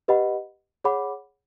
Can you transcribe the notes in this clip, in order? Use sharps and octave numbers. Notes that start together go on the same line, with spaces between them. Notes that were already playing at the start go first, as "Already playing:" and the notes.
G4 B4 D#5 F#5 B5
G#4 C#5 F#5 B5 D6